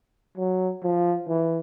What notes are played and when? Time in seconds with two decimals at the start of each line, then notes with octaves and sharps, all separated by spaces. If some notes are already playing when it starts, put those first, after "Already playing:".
0.37 F#3
0.83 F3
1.28 E3